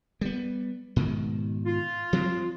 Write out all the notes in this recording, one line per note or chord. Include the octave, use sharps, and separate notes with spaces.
G3 B3
G#2 B2 D#3
F4
F3 G3 C4